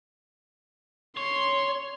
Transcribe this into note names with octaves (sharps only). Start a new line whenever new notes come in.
C#5 C6